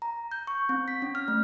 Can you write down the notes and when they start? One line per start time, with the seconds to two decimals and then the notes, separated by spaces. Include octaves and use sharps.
0.02 A#5
0.31 G6
0.47 C#6
0.69 C4
0.88 B6
1.02 C#4
1.15 F6
1.28 A3